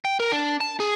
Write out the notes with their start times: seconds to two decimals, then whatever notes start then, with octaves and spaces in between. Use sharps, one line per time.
0.05 G5
0.20 A#4
0.32 D4
0.61 A5
0.80 G#4